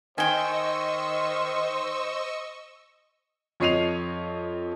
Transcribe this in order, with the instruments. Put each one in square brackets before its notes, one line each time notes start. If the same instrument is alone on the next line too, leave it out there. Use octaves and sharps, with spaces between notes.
[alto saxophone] D#3 [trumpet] C5 [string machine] D#5 C#6 E6 [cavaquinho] G5 G#5
[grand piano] F2 C#5 D#5 C7 D#7 F7